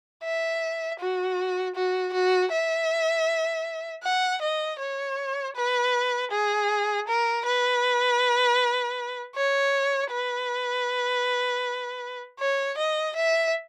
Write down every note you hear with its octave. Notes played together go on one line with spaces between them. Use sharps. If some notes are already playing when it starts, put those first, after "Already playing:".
E5
F#4
F#4
F#4
E5
F#5
D#5
C#5
B4
G#4
A#4
B4
C#5
B4
C#5
D#5
E5